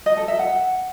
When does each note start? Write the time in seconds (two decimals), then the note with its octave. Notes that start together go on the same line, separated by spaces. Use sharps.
0.06 D#5
0.17 A4
0.28 E5
0.39 F#5